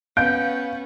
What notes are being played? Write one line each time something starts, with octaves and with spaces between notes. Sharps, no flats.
B3 C#4 F5 G6 D7